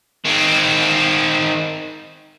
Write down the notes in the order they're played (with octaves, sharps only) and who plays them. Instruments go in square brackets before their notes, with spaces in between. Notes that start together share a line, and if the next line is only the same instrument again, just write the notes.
[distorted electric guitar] D#3 C4